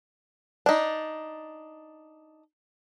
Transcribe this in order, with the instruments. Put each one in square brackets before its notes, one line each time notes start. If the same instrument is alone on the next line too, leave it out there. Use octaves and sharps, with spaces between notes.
[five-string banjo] D4 D#4